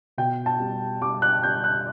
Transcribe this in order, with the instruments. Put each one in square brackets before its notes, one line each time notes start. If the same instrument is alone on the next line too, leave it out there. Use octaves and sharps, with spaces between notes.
[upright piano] B2 G5
A5
G3
G3 D6
F#6
G3 G6
F#6